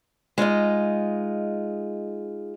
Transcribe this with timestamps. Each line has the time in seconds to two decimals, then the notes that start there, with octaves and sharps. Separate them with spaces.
0.38 G#3 D#4 F4 D#5